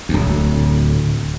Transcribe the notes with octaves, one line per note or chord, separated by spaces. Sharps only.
D1 D2